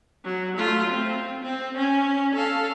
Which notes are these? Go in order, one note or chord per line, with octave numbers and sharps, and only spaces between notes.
F#3
A3 F4
C4
C4
C#4
A4 F5